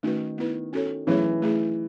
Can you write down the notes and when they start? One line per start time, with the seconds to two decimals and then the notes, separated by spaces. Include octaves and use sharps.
0.03 D#3 A3 C#4 F#4 B4
0.38 B3 E4 B4
0.73 C#4 F#4 A4 C#5
1.07 E3 F#3 A3 C#4 G#4 C#5
1.42 A3 E4 G#4